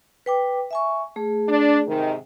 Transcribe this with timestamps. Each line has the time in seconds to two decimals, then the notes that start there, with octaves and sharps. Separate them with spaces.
0.26 B4 G5 D6
0.71 E5 G#5 C#6
1.16 A3 G#4
1.49 D4
1.88 G#2 C3 D#3